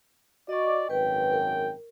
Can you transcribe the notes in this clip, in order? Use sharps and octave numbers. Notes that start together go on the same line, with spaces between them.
F#4 D5 D#5 C#6
G#1 F#2 B4 G5
A#4